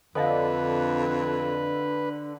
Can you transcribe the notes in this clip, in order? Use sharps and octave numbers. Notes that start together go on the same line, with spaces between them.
F2 D3 A4 B4 D#5 F5